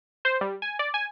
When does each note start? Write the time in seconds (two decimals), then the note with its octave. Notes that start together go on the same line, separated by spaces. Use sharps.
0.25 C5
0.41 G3
0.62 G#5
0.79 D5
0.94 G#5